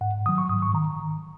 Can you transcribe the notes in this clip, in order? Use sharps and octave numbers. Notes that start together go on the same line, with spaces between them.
G#2 F#5
D#3 F#3 D#6
C#6
G#2 D#6
C#6
D#3 A#5